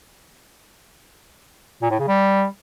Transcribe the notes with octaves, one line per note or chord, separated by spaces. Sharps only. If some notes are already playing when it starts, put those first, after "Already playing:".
A#2
A2
C#3
G3